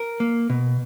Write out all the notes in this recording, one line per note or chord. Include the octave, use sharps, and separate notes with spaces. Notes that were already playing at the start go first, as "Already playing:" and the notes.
Already playing: A#4
A#3
B2